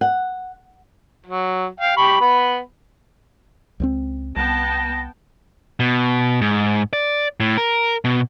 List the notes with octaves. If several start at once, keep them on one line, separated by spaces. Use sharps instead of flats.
F#5
F#3
F5 G5
G4 B5 C#6
B3 B5
C#2 F3 C4
C2 B3 G5 A5 A#6
B2
G#2
D5
A2
A#4
B2